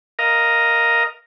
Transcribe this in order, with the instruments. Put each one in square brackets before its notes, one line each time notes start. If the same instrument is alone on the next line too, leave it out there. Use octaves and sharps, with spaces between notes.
[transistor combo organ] A#4 D#5 F5 A#5